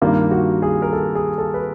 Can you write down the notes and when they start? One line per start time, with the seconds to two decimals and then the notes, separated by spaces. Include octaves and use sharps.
0.02 G2 D#3 G3 A#3 F4
0.31 F#4
0.62 G#4
0.82 A#4
0.93 A4
1.15 G#4
1.38 A4
1.54 B4